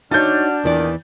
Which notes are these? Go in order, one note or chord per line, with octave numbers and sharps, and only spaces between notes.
D4 D#4 F#4 C#5 F6 G6 A6
E2 A#2 D#3 E3 D5